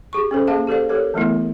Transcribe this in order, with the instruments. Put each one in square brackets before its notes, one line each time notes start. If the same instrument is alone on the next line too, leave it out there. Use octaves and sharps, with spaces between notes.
[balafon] G4 G#4 C#6
C#4 A4 C5
A#3 G#4 E5 F5 A5
G4 A4 C5 D5 F5
G4 A4 A#4 C#5
E3 A3 B3 E4